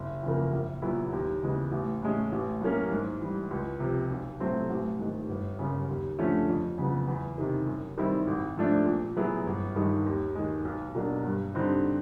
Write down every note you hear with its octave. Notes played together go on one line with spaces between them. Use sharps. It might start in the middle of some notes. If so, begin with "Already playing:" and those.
Already playing: F#1
E2 C#3 F3 A#3
A#1
A#2 F#3 B3 E4
D#2
C#3 E3 G#3 B3
A1
A2 E3 G#3 C#4
A1
A2 F#3 A#3 C#4
G#2
E3 G3
C#2
C3 F3
B1
A2 F#3 A3 C4
A1
G#2 D#3
G1
F#2 C#3
D#2
D3 F3 A3 C#4
F2
C#3 F#3 B3
E2
C3 D#3
F#2
D#3 G3 C4 E4
G#1
G#2 F3 A3 D4
A#2
F#3 B3 E4 G#4
G1
G2 D#3 G#3
D#2
D#3 G#3
B1
B2 F#3 A#3 D4
G2
D3 G3 C4 D#4